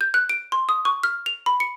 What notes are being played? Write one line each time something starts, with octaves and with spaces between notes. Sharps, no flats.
G6
F#6
D7
C6
D#6
C#6
F6
F7
B5
C#7